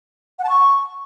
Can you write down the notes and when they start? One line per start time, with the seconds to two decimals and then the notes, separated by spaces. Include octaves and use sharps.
0.39 F#5
0.44 A5
0.49 C#6